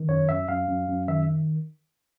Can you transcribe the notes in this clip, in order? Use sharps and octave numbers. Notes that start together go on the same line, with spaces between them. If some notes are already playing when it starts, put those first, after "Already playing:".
Already playing: D#3
F#2 C#5
F#2 E5
F#2 F5
F#2
F#2
D#3 E5